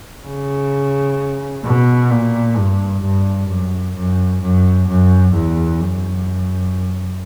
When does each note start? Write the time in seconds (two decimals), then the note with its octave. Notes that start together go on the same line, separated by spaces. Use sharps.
0.26 C#3
1.64 B2
2.10 A#2
2.57 G2
3.03 G2
3.49 F#2
3.96 F#2
4.42 F#2
4.88 F#2
5.34 E2
5.79 F#2